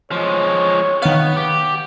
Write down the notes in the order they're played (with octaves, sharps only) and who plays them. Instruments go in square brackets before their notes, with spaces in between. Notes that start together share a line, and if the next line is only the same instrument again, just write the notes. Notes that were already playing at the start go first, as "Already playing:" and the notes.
[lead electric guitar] F3 G#3 [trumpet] C#5
[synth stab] D#3 F5 [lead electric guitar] B3
[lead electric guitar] G4